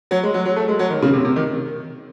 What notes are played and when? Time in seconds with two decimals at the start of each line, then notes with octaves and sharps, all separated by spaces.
0.11 F#3
0.23 G#3
0.34 F#3
0.45 F#3
0.56 A3
0.68 G#3
0.79 F#3
0.90 D#3
1.02 C#3
1.13 C3
1.25 C3
1.36 D#3